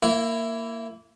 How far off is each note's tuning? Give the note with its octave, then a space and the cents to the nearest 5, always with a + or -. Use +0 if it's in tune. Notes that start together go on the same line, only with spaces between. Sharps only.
A#3 -15 E4 +10